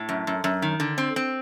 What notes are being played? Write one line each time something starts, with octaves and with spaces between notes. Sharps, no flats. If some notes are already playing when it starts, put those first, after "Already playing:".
Already playing: A2
F#2
F#2
F#2
D#3
D3
C4
C4